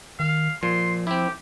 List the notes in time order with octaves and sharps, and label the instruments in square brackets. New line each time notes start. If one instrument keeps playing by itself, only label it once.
[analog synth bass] D#3 [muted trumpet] F5
[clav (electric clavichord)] A#2 [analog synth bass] F3 [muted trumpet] C6
[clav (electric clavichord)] C4 E4 [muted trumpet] G4